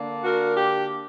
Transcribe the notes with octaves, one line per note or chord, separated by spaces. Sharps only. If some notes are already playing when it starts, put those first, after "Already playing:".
Already playing: D3 A#3 D4
F#4 A#4
G4